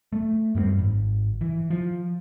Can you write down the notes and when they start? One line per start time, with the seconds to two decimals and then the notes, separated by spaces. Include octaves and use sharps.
0.13 A3
0.55 F#2 G3 A#3 C4
0.79 G#1
1.41 E3
1.70 F3